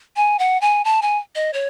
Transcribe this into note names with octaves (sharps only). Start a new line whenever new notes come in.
G#5
F#5
G#5
A5
G#5
D#5
C#5